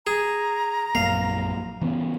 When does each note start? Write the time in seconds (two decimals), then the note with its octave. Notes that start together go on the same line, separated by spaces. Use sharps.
0.07 G#4 A#5
0.95 A#1 F#2 A#3 F5
1.82 E3 B3 C#4